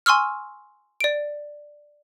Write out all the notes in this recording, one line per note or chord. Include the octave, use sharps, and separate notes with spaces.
G#5 C6 C#6 E6 F6
D5 D7